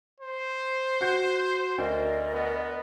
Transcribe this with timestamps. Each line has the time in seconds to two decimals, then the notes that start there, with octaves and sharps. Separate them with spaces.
0.20 C5
1.01 F#4 G6
1.78 D2 A#4 D5 D#5
2.33 B3